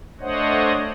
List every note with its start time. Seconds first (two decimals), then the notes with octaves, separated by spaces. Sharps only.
0.21 A3 D4 C5 C#5 D#5 F#5